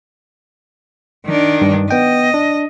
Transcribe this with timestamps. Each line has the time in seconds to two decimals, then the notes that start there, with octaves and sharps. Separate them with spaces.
1.26 D#3 D4
1.62 G2
1.91 B3 D#5 G5
2.34 D4